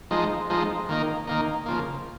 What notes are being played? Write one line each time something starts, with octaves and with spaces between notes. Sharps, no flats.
F3 G#3 D#4
F3 G#3 D#4
D#3 A#3 D#4
D#3 A#3 D#4
C#3 F3 A#3